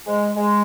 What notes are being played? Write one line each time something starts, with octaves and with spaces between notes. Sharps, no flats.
G#3
G#3